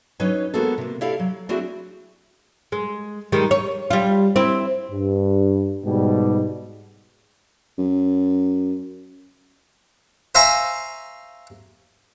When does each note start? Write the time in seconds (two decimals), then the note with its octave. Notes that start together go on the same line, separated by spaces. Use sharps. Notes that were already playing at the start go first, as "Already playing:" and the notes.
0.20 F#3 C#4 D#4 B4 C#5
0.54 G#3 A#3 B3 F#4 G#4 A4
0.78 C3 A#3
1.01 E4 G4 A4 D5 E5 F5
1.19 F#3
1.49 A3 C4 D4 E4 F#4 G#4
2.72 G#3
3.32 D#3 G3 G#3
3.51 C#5
3.90 G3 F4
4.36 C4 E4
4.91 G2
5.84 G#2 B2 G3
7.78 F#2
10.35 C5 E5 F5 G#5 A#5 C#6